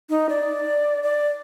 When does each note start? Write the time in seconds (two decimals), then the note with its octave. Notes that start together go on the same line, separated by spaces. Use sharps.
0.10 D#4
0.29 D5
1.03 D5